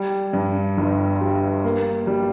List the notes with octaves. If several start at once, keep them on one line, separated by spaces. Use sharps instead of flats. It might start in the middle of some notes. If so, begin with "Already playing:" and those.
Already playing: G3
G2
G1
G3
A#3
G3